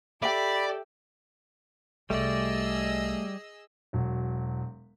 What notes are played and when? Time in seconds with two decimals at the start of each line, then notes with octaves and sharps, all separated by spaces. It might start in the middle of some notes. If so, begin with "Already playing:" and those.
0.22 G4 A4 D5 E5 G5 B5
2.10 C2 G3 A3 G#4 D5 D#5 E6
3.93 E1 F#3